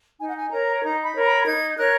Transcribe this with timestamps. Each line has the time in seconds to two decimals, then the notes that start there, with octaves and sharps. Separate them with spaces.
0.19 D#4 G#5
0.27 F#5
0.36 G#5
0.50 A#4 C#5 A#5
0.82 D#4 A#5
1.03 B5
1.14 A#4 C#5
1.24 B5
1.45 D#4 G#6
1.77 A#4 C#5 F#6